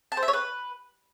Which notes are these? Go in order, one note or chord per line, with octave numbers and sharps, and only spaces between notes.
A5
C5
E5
C#5
B4